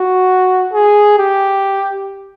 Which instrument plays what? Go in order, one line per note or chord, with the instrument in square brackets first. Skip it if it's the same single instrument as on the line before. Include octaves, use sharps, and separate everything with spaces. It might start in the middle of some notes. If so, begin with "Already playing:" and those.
Already playing: [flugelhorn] F#4
G#4
G4